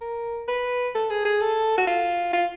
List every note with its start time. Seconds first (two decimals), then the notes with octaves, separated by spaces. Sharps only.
0.01 A#4
0.48 B4
0.95 A4
1.10 G#4
1.25 G#4
1.41 A4
1.77 F#4
1.87 F4
2.33 F4